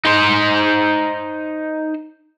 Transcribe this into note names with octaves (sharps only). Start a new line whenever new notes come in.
D#4 C5